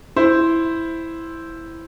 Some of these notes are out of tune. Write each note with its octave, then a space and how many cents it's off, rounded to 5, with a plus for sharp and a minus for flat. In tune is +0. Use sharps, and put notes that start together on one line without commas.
E4 +0 C5 +0